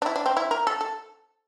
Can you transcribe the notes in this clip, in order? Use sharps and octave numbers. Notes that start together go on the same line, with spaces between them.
D4
E4
D4
C4
E4
A#4
A4
A4